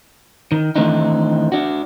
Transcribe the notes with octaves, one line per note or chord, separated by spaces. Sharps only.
D#3
D#3 E3 A3 C4 D4 D#4
D4 F#4